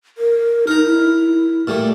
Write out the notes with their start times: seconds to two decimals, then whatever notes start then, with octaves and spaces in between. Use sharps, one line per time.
0.18 A#4
0.67 D#4 A#4 A#5
0.84 E4
1.67 A#2 G3 A3